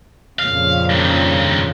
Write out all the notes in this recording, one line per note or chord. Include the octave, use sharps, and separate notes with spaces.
F2 A#2 C#3 F5
G2 D#3